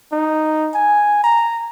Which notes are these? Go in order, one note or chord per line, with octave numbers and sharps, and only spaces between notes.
D#4
G#5
A#5